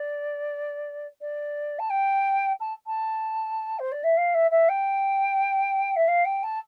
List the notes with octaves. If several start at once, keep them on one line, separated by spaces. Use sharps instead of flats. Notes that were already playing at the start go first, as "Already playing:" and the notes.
Already playing: D5
D5
A5
G5
A5
A5
C5
D5
E5
F5
E5
E5
G5
E5
F5
G5
A5